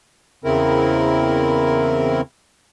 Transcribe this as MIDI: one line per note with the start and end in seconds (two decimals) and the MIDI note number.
0.44 2.21 40
0.44 2.21 49
0.44 2.21 60
0.44 2.21 64
0.44 2.21 70